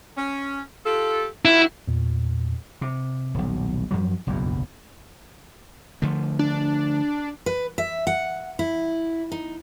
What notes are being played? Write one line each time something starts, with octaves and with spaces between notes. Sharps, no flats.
C#4
F4 G4 A4
D#3 F3 E4 F#4
E2 A#2
C3
D#1 B1
F#2 F3 F#3
F#1 B1 E2 G2
D3 F3 A3
D4
B4
E5
F#5
E4
D#4